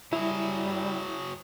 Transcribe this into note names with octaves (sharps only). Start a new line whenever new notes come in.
F#3 G3 E4 G#4